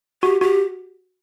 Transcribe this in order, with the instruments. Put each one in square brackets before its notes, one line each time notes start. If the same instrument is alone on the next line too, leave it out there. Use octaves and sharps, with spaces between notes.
[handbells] F#4 [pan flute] G4
[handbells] F#4 [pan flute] G4